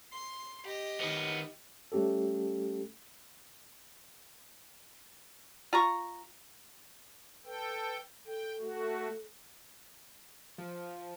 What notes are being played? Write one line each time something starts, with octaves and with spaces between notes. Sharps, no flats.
C6
G4 D#5
D#3 B3
G3 A3 C#4 G4 A4
F4 A#5 C#6
A4 B4 G5
A4 G5
A3 F#4
F3